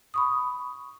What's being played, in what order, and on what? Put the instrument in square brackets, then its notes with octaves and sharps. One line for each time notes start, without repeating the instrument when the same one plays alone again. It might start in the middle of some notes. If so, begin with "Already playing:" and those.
[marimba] B5 C#6 D#6